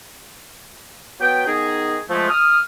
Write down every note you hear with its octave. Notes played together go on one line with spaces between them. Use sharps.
F#3 B3 B4 G5
D#3 B3 D#4 G#4
F3 G#3 A3
D#6 F6